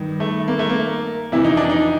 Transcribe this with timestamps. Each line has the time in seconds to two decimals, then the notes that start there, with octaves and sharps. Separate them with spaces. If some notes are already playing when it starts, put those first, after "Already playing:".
Already playing: G2 D#3
0.20 A3
0.48 A#3
0.59 A3
0.70 A#3
1.32 F2 C3 E3 E4
1.44 D#4
1.57 D4
1.70 D#4